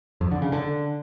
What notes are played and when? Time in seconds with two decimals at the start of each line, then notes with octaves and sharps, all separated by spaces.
0.21 F2
0.31 D3
0.42 C#3
0.52 D3